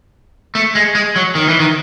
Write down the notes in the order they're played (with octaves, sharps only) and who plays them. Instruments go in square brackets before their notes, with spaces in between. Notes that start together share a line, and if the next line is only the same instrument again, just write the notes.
[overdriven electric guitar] A3
G#3
G#3
F#3
D#3
E3
D#3